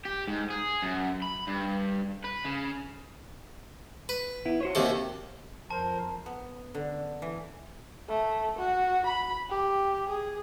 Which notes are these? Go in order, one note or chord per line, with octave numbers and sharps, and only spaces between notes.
G4
G#2
G#4
F#2
B5
G2
B4
C#3
B4
B3 E4
F#4 C5 C#5
D#2 C3 A4
F2 A#4 C5 A5
B3
D3
E3
A3
F#4
B5
G4
G#4